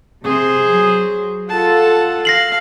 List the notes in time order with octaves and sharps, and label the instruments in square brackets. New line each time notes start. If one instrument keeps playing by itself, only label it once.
[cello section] C3 [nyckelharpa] G#4 C5
[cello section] F#3
[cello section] F4 A4 [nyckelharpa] F#5 A5
[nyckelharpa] F5 [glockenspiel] A#6 C7 F#7